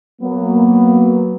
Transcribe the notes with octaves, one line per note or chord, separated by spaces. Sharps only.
F#3 A#3 B3